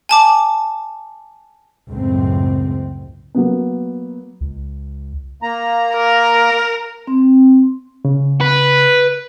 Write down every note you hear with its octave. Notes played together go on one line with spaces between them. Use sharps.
G#5 A5 D6
C#2 F#2 A2 C4
F#3 A#3 B3
C#2
A#3 A#5
A#4
C4
C#3
B4